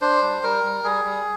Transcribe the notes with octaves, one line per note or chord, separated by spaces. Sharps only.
D4 C5
G3
G3 A#4
G3
G3 G#4
G3